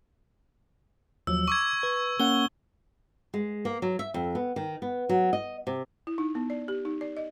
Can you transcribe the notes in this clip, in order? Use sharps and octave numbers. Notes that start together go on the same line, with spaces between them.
D#2 F3 F#3 E6
C#6 D6 E6 G#6
B4
A#3 C#4 F#5 G7
G#3
A#3
F#3
E5
F2
B3
D#3
B3
F#3
D#5
C3
E4
D#4
B3
D5
G4
D#4
D5
D#5